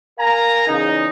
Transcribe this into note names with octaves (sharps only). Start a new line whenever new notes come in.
A#4 F5 G#5 A#5
E2 C#3 D#4